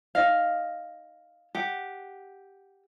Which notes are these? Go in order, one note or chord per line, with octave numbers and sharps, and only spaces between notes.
D#4 D#5 F5
G4 F#5